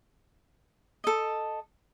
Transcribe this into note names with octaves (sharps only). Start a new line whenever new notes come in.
A4 D#5